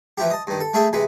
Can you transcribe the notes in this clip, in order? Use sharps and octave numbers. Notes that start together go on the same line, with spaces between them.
E3 F3 E4 G4
D#5 A5
G2 D#3
A4
A3 E4 G#4 E5 G5 A5
C3 E3 G#3 B5